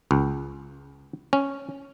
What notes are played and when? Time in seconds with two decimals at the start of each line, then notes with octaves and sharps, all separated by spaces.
0.11 C#2
1.33 C#4